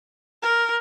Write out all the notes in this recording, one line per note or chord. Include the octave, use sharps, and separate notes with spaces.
A#4